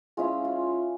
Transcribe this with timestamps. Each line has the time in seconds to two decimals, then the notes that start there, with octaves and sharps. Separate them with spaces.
0.17 G#3 C#4 E4 F4
0.45 F4